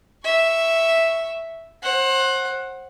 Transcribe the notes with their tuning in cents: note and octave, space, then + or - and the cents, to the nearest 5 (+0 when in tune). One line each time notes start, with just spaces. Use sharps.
E5 +0 C#6 +0
C5 +30 F#5 +0